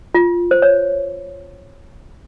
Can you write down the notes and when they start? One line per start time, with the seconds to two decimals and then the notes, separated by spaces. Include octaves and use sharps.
0.14 F4
0.51 C5
0.62 C#5